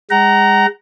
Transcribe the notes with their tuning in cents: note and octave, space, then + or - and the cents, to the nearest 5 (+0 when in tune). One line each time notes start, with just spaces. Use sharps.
G#3 -35 F#5 +40 A#5 +0